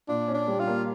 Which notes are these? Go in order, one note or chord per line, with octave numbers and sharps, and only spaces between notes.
A#2 D4
C#4
D4
G3
F4
A#3